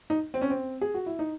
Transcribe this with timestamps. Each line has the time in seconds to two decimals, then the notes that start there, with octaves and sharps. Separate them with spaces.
0.10 D#4
0.34 C4
0.42 C#4
0.50 C4
0.81 G#4
0.94 F#4
1.06 E4
1.19 D#4